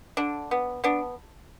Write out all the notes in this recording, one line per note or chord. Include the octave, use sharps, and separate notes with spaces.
D3 D4
B3
B3 D4